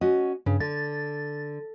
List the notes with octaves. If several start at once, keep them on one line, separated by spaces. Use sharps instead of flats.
C#4 F#4 D#5
G2 C#3
D3 A6